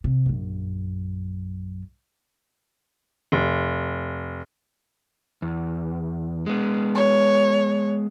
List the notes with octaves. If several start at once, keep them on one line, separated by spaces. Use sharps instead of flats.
C3
A#1 F#2
F1
E2
G#3 B3
C#5